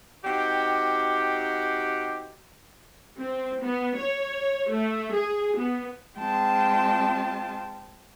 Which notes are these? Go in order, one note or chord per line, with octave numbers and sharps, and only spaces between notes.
C4 D#4 F#4 G4
C4
B3
C#5
A3
G#4
B3
G#3 C4 F4 G5 A5